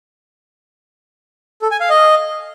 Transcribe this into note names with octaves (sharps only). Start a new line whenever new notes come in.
A4
G#5
F5
D#5